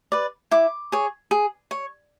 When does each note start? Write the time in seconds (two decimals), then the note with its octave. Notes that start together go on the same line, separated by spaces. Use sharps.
0.12 B4 D5
0.51 E4 D6
0.92 G#4 C#5
1.31 G#4
1.71 C#5